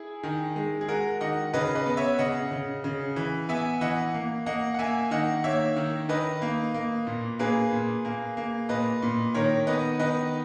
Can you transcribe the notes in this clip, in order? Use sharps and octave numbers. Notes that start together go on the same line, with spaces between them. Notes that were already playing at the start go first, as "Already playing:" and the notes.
Already playing: E4 G#4
D#3
G#3
G#4
G#3 F#4 A#4
D#3 D#5 F#5
C#3 B4 D#5
B4 D#5
B3
C#5 E5
C#3 D#5 F#5
C#3
C#3
E3
B3 E5 G#5
E3 D#5 F#5
A#3
A#3 D#5 F#5
F#5
A#3 E5 G#5
D#3 D#5 F#5
A#3 C#5 E5
D#3
D#3 B4 D#5
A#3
A#3
A#2
A#3 G#4 B4
A#2
A#3
A#3
A#2 B4 D#5
A#2
D#3 A#4 C#5
B3 B4 D#5
D#3 B4 D#5